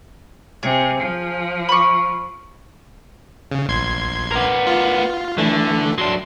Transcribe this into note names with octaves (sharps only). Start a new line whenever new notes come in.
C3 G#4
F3
B5 C#6
C#3
A#1 C6 G#6
B3 A#4
F4
D3 E3 A3
F#3 D4 C6